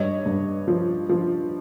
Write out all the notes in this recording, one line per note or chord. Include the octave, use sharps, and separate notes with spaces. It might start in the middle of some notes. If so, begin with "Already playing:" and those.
Already playing: G2 C#5 D#5
G2
F3
F3